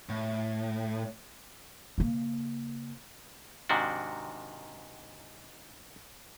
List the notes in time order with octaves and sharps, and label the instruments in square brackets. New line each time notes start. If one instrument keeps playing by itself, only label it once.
[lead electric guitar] A2
[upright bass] C#3 A#3
[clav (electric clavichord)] G#2 C3 D#3 D4 F#4